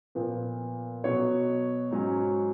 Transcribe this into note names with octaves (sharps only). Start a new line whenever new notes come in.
A#2 F3 B3
B2 F#3 B3 C#5
G#2 F#3 C#4